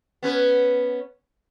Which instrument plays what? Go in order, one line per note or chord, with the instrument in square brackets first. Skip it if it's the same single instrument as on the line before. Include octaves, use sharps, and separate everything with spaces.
[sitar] B3 C#4 B4